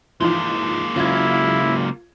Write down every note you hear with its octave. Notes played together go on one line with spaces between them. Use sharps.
E3 F3 G#3 A#3 D#4
C#3 F#3 E4 F4 G#6